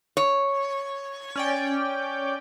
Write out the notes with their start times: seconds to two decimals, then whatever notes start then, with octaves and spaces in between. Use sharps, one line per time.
0.17 C#5
1.36 C#4 D5 G5